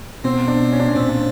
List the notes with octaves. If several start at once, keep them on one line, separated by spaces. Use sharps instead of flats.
B2 B3 C4
D4
C#4
D4
C#4
A#2 A#3 C4
D4